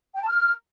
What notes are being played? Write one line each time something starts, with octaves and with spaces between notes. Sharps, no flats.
G5
A5
F6